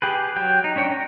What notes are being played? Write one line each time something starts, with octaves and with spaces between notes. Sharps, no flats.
G4 G#4 B4
F#3 G5
D#4
C#4 D4 C#5 G5
A#5